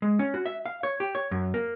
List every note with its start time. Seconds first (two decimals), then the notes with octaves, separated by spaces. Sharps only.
0.02 G#3
0.19 C#4
0.34 F#4
0.46 E5
0.66 F5
0.83 C#5
1.00 G4
1.15 C#5
1.31 F#2
1.54 A#3